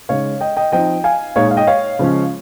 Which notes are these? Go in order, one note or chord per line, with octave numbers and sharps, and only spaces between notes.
C#3 G#3 D#4 C#5 F5
D#5 G5
D#5 G5
F3 C4 D#4 D#5 G5
F5 G#5
A#2 G#3 D#4 C#5 F5
F5
D#5 G5
C#5 F5
C#3 F3 G#3 C#4